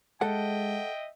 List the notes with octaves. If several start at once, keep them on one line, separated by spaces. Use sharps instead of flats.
G#3 A4 D#5 E5 F#5 G5